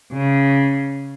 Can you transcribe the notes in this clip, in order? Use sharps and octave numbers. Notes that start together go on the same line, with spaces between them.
C#3